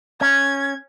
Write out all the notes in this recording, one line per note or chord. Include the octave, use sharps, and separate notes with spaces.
C#4 G#6